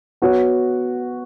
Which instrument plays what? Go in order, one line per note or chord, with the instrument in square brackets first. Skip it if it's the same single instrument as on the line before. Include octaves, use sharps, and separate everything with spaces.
[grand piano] B3 F#4 C#5